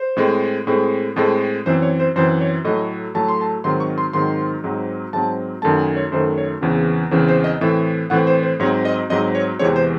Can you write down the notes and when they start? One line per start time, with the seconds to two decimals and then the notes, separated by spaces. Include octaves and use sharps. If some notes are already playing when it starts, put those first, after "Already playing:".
Already playing: C5
0.17 A2 G#3 C4
0.67 A2 G#3 C4
1.16 A2 G#3 C4 A4
1.66 F#2 E3 C4 C5
1.82 C#5
2.00 C5
2.16 F#2 E3 C4 C5
2.41 C#5
2.65 A2 F#3 A3 D#5
3.15 A2 F#3 A3 A5
3.28 C6
3.41 A5
3.64 G#2 D#3 F#3 C4 C6
3.80 C#6
3.98 C6
4.13 G#2 D#3 F#3 C4 C6
4.64 G#2 F#3 C4
5.13 G#2 F#3 C4 A5
5.62 F#2 D#3 A3 A5
5.79 G#5
5.96 C#5
6.12 F#2 D#3 A3 C5
6.38 C#5
6.61 E2 C#3 E3 C4
7.11 E2 C#3 E3 C4 C5
7.28 C5
7.44 D#5
7.61 A2 E3 C4 E5
8.10 A2 E3 C4 F#5
8.27 C5
8.43 C5
8.60 G#2 F#3 C4 C#5
8.85 D#5
9.10 G#2 F#3 C4 D#5
9.35 C#5
9.59 E2 C3 E3 G#3 C4 C#5
9.76 C5